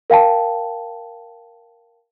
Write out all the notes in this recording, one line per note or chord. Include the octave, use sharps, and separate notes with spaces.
A#4 F5 G5 A5